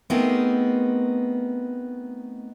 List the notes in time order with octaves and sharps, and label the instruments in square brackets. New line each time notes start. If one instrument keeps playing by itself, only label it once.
[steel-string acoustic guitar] A3 B3 C4 D#4 G#4 A#4